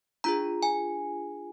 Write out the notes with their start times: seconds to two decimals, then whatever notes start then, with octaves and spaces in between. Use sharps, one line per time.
0.24 D4 F4 G#4 A#5
0.63 G#5